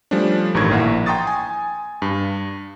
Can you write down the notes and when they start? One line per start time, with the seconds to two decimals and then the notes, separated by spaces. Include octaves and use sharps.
0.11 F3 G3 A3 C#4 D4
0.54 A1 G2 D#3 C#6 G#6
0.71 A#1 A#3 E4 F#5
1.06 G5 A#5 C6 C#6 D#6 A6
1.27 G#5
2.02 G2